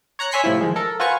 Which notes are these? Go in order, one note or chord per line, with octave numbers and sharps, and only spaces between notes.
C#5 A#5 F#6 C#7
C#5 E5 G#5 C6 B6 C#7
A2 C3 F3 E4
D#3 F3 G#3
A4 A#4
F4 F#4 B4 C5 G#5 C#6